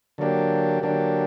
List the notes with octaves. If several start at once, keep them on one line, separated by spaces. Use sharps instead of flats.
D3 F#3 A#3 D4 G4
D3 F#3 A#3 D4 G4